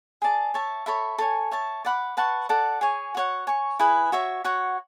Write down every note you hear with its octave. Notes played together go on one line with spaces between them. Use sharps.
G#4 D5 A5
C#5 E5 A5
A4 C#5 E5 B5
A4 C#5 G#5
C#5 E5 A5
D5 F#5 B5 D6
B4 F#5 A5 C#6
A4 D5 F#5 A5
G#4 C#5 G#5
F#4 C#5 F#5
C#5 G#5 C#6
E4 G#4 B4
F#4 C#5 E5
F#4 C#5 F#5